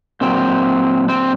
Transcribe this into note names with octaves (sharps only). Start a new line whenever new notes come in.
A#2 F#3 C4
C4